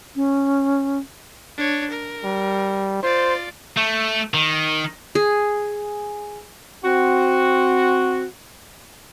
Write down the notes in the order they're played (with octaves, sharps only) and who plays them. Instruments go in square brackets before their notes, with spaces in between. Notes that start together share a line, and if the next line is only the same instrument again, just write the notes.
[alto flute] C#4
[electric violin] D4 C#5
A#4
[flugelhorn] G3
[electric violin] F4 D5 [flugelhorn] C5
[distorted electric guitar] A3
D#3
[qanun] G#4
[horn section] C4 F#4